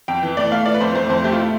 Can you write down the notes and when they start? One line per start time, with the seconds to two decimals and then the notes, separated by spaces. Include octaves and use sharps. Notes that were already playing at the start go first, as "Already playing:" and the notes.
0.08 F2 G5
0.23 E3
0.37 A3 D5
0.52 A3 F5
0.66 E3 D5
0.74 B4
0.81 F2 C5
0.95 A3 C5
1.09 F2 C5
1.24 A3 G4
1.32 F4
1.39 E4